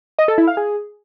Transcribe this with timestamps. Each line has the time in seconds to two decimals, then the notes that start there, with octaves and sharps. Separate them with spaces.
0.19 D#5
0.28 A4
0.38 E4
0.47 F5
0.57 G#4